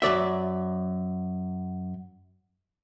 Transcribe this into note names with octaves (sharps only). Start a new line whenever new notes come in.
F#2 F#3 D5 E5